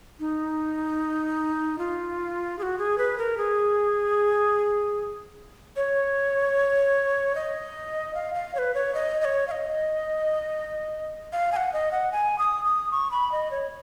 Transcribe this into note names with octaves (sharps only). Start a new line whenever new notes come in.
D#4
F4
G#4
F#4
G#4
B4
A#4
G#4
C#5
D#5
F5
F5
C#5
B4
C#5
D#5
D#5
C#5
F5
D#5
F5
G#5
F#5
D#5
F#5
G#5
D#6
D#6
C#6
B5
D#5
C#5